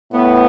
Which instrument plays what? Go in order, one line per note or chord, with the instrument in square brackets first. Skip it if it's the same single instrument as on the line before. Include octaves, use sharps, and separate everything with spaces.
[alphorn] A2 [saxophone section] B3